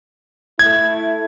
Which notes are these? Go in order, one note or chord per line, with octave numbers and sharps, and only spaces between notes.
A3 E4 G#6